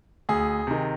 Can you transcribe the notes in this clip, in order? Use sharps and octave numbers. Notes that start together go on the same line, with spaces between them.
D2 G#4
C3 D#3